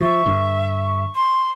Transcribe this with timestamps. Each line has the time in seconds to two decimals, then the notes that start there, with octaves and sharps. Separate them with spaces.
0.01 F3 E5 C#6
0.26 G2 D3
1.15 C6